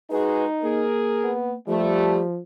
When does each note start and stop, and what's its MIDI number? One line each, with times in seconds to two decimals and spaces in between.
0.11 0.45 56
0.11 0.85 63
0.11 0.45 66
0.11 0.45 68
0.11 0.46 71
0.62 1.57 58
0.62 1.34 68
0.62 1.34 70
1.24 1.54 59
1.68 2.40 53
1.68 2.20 55
1.68 2.18 57
1.68 2.25 67